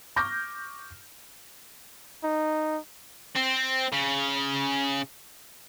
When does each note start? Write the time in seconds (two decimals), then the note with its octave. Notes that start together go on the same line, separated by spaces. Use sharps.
0.16 C#6 D6 F6 G6 A#6
2.24 D#4
3.36 C4
3.92 C#3